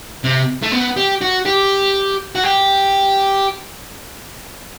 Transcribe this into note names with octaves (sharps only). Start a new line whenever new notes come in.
C3
A3
B3
G4
F#4
G4
F#4
G4